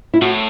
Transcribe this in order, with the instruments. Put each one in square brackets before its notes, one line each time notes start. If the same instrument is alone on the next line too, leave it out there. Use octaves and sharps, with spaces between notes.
[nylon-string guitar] E4
[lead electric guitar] A2 [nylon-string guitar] F#4